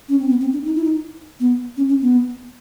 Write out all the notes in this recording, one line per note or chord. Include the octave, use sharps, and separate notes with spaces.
C#4
C4
B3
C4
D4
D#4
E4
D#4
B3
C#4
C#4
B3